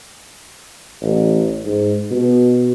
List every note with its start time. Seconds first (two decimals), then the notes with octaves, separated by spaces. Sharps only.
1.02 A1
1.65 G#2
2.11 B2